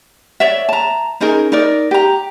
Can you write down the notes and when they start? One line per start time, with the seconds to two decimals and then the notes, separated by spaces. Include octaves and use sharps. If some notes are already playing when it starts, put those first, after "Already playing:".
0.40 C#5 D5 E5
0.69 A5 A#5
1.21 C#4 D#4 G#4 A#4
1.52 D#4 A#4 D5
1.91 G4 A#5